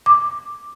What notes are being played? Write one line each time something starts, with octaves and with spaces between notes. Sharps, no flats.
D6